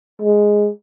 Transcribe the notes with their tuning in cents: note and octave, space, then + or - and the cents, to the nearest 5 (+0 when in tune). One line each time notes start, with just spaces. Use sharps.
G#3 +0